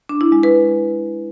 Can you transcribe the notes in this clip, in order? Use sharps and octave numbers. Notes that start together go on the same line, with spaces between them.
D4
E4
G#3
B4